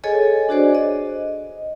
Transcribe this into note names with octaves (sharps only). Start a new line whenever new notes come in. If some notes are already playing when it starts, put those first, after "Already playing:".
G#4 A4 C#5 D#5 G#5
D4 F#4 G#4 C5 D5
D#5